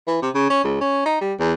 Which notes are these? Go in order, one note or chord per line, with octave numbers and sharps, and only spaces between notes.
E3
C3
C#3
C#4
C#2
C#4
D#4
G3
E2